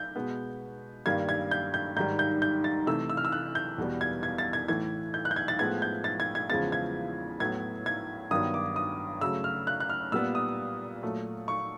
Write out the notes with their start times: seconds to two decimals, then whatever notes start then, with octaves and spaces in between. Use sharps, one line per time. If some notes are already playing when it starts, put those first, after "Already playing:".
Already playing: G6
0.16 B2 G#3 B3
1.06 G2 D#3 G3 A#3 G#6
1.29 G#6
1.51 G6
1.74 G6
1.96 G#2 D#3 G3 G6
2.19 G6
2.42 G6
2.64 A6
2.87 C3 E3 A3 E6
3.10 E6
3.17 F6
3.25 E6
3.32 F#6
3.55 G6
3.78 E2 B2 G3 B3
4.01 G#6
4.23 G#6
4.38 A6
4.53 G#6
4.68 A2 E3 A3 G#6
5.14 G6
5.25 F#6
5.31 G6
5.36 G#6
5.48 A6
5.59 A2 F3 G#3 B3 G#6
5.82 G6
6.04 A6
6.20 G#6
6.35 G#6
6.50 E2 C#3 F3 G#3 B3 A6
6.72 G#6
7.40 A2 F#3 B3 G#6
7.86 G#6
8.31 G2 D#3 F#3 B3 D#6
8.54 D6
8.76 D#6
9.21 C#3 F#3 A3 E6
9.44 F6
9.67 F#6
9.80 F#6
9.90 F6
10.12 A#2 G3 B3 E6
10.35 D#6
11.03 A#2 F#3 A3
11.48 C#6